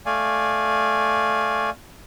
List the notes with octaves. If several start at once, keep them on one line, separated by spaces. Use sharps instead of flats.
A3 D5 F5 G#5